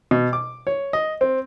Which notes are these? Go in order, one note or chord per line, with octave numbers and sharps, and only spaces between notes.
B2
D6
C#5
D#5
C4